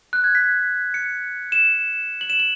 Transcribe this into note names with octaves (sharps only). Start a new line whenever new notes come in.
F#6
G#6
B6
C#7
E7
F#7
E7
F#7